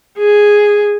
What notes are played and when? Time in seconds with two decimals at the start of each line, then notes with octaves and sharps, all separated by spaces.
0.18 G#4